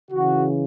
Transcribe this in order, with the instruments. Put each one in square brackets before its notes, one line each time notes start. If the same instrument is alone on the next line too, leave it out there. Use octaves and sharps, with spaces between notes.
[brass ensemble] C#3 E3 F#4